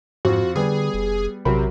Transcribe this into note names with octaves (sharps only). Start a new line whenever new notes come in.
F2 G#2 F4 F#4
D3 G3 B3 G#4
F1
A#1 C3 F#3 A#4 B5